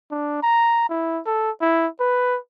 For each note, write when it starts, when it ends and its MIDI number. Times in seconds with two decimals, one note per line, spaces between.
0.11 0.42 62
0.43 0.89 82
0.89 1.20 64
1.26 1.51 69
1.61 1.87 64
2.00 2.38 71